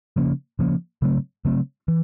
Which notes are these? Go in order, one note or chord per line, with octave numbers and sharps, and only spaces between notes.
C#3 F3 A#3 C#4
C#3 F3 A#3 C#4
C#3 F#3 A3 C4
C#3 F#3 A3 C4
E3